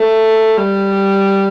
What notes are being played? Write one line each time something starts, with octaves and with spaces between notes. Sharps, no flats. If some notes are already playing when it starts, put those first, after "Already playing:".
Already playing: A3
G3